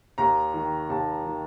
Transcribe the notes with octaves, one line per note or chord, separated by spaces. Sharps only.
D#2 A#5
D#3
D#2 A5
D#3